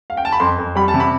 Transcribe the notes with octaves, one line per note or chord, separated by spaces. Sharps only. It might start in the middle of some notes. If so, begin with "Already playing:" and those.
F5
G5
A5
B5
F2 C6
F2
G3 B5
A5
C3
B5